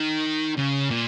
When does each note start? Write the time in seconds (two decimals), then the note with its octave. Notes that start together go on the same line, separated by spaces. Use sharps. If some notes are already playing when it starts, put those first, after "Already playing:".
Already playing: D#3
0.57 C#3
0.90 A#2